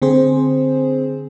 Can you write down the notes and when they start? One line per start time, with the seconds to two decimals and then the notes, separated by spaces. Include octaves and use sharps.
0.02 D3 C4 G#4 C5